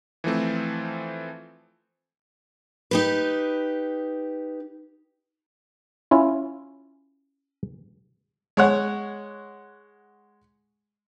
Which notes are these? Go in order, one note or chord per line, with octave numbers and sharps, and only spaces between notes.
E3 F3 A3 C4
D#4 G4 B4
C#4 E4 F4
G#3 C#5 F#5